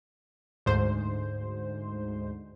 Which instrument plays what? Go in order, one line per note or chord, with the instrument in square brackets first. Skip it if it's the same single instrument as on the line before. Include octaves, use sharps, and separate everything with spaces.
[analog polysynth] D2 G#2 C5